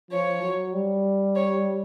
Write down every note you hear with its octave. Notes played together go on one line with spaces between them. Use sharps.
F3 C#5
F#3
G3
C#5